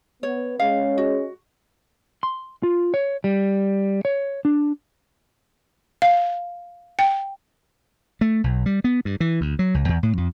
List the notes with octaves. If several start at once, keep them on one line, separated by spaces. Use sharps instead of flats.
B3 C#5
G#3 C#4 F5
F#4
C6
F4
C#5
G3
C#5
D4
F5
G5
A3
B1
G3
B3
G2
E3
D2
F#3
C#2
E2
A2
F2